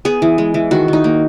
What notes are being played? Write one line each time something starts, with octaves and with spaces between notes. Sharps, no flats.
B3 G#4
E3
G#3
E3
D#3 F#4
D#3 D#4
A#3